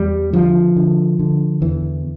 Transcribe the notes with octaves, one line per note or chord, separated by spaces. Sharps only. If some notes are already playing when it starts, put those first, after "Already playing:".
Already playing: E2 G3
D3 F3
D3
D3
E2 E3